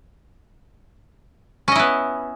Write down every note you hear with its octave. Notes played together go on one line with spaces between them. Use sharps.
B3 C#4 E4 D#5